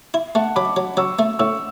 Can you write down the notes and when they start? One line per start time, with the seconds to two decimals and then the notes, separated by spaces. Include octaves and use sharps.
0.14 E4
0.35 A3 F#5 A5
0.56 F#3 B5 D6
0.76 F#3
0.97 F#3 C#6 E6
1.19 A3
1.39 A2 C#6 E6